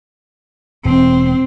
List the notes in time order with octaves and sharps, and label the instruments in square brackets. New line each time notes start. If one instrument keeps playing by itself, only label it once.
[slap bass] E1 [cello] C4